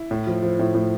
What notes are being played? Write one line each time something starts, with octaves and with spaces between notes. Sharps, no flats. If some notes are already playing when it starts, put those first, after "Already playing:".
Already playing: E4
A2
F3
F3
A2
A2